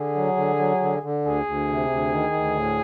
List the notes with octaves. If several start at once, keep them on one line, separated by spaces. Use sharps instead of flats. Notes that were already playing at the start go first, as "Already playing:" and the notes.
Already playing: D3 G#4
F#3
D3
F#3
D3
D3
D2 G#4
D2
C3
D2
D#3
D2
A2